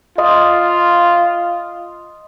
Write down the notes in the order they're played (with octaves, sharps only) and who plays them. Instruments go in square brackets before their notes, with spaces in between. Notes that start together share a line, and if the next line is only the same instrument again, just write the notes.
[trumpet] F4 [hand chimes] D#5 C6 D#6